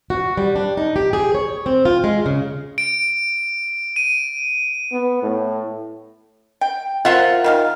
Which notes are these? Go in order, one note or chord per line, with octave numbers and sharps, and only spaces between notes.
F#4
G3
D4
D#4
G4
G#4
C#5
C4
F4
G#3
C#3
D7
D#7
B3
A2
G5
F4 A#4 C5 E5 F#5
D#3 G4 F5